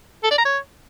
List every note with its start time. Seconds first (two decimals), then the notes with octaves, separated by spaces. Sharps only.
0.24 A4
0.31 D5
0.38 A#5
0.45 C#5